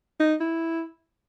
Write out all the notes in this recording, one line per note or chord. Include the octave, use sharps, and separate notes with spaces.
D#4
E4